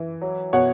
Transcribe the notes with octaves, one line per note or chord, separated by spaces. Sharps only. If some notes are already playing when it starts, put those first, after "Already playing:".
Already playing: E3
F#3
B2 C#5 F#5